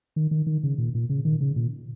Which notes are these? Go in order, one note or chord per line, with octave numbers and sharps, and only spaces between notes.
D#3
D#3
D#3
C#3
A#2
A#2
C#3
D#3
C#3
A#2